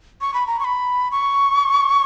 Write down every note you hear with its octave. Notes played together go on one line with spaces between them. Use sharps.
C#6
B5
A#5
C#6
B5
C#6